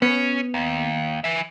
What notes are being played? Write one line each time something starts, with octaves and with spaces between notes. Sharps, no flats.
B3 C#4
D#2
E3 E5